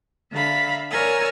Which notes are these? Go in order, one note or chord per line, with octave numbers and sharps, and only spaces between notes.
D3 E5 F5 A#5 B5
A#4 C#5 D5 G#5 E6 A#6